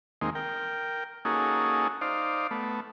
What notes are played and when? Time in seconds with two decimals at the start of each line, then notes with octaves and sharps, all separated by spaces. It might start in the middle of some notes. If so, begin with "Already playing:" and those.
0.22 D#2 D#3 G#3 A#3 C4
0.35 A#4 G5
1.25 A#3 C#4 D#4 F#4 G#4 A4
2.01 D#4 C5 D5 F5
2.51 A3 B3